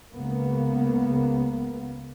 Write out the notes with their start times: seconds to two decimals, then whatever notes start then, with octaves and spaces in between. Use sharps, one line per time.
0.15 C#2 C#3 A#3 B3